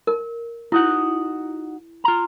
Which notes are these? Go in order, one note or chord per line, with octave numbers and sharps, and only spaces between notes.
A#4
D#4 E4 F#4 F#5
F4 A#5